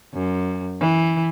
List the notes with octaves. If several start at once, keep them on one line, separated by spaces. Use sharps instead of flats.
F#2
E3